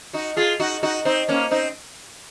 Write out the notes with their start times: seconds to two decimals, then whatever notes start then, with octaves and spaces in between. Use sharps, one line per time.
0.13 D#4 F#4
0.37 F4 G#4
0.60 D#4 F#4
0.83 D#4 F#4
1.05 C4 D#4
1.29 A#3 C#4
1.51 C4 D#4